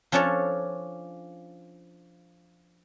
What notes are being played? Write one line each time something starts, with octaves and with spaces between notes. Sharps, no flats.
F3 C#4 D4 A4 C#5